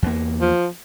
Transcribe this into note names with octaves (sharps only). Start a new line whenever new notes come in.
E2 A#3
F3